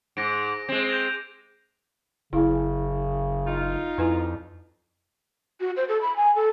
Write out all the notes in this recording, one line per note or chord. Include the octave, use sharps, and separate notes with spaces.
G#2 D6 A#6 D7
G#3 C4
G6 A#6 F7
F#1 C#3 E4
D#4 F4
F2 E4 B4 G#5
F#4
C5
A4
B5
G#5
A4